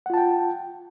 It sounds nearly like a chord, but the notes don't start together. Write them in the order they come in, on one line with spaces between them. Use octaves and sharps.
F#5 F4 A5 G5